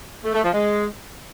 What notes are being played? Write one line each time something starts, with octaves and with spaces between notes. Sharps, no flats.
A3
A3
F3
G#3